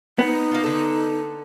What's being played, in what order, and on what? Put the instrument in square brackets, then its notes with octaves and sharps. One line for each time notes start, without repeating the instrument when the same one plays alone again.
[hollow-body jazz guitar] B3 [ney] D#4
[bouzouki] A#3 F4
D3 A4